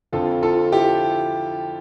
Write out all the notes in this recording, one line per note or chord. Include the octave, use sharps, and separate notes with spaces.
F2 D3 F3 F4 A4
F4 A4
E4 G4